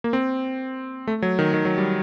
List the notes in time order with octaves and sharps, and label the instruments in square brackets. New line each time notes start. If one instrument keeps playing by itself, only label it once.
[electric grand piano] A#3
C4
A3
F#3
D#3
D#3
F#3
G3